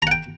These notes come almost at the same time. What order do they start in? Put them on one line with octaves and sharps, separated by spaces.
A#5 F#5 G5